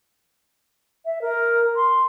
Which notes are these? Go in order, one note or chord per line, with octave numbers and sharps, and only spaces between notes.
E5
A#4
C6